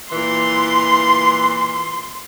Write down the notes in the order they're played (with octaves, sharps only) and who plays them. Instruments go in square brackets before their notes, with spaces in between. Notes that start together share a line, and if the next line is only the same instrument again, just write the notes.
[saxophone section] A#2 E3 [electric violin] C6